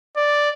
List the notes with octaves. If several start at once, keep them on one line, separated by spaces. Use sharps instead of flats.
D5